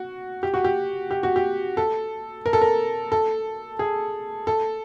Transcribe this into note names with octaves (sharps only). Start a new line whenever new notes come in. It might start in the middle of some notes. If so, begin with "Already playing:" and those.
Already playing: F#4
G4
F#4
G4
G4
F#4
G4
A4
A#4
A4
A#4
A4
G#4
A4